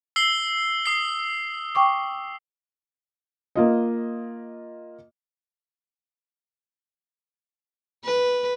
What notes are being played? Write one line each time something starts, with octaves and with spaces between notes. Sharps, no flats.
E6 C7 G7
D#6 C7
G5 C#6 D6
A#3 F4 D#5
B4